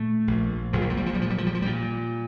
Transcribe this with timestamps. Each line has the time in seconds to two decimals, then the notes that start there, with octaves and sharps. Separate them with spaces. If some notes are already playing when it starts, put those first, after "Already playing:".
Already playing: A#2 A3
0.27 A#1
0.73 A#1 F3
0.82 G3
0.90 F3
0.97 G3
1.06 F3
1.14 G3
1.19 A#2 F3
1.30 G3
1.38 F3
1.47 G3
1.55 F3
1.62 G3
1.66 A#2